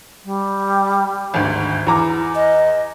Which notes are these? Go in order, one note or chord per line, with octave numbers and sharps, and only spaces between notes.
G3
G#1 D2 G2
E2 E4 A#5 D6
D#5